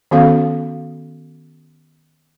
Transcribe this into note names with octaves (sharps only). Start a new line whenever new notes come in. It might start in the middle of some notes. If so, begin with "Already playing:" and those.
D#3 B3 C#4 F#4 A4 F5